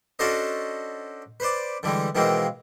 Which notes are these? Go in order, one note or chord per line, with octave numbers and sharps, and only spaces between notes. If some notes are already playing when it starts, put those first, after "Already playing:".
C#4 D4 F#4 A4 C5 D#5
B4 C5 D5
D3 E3 G3 G#3
B2 D#3 E3 G#3 A#3 C4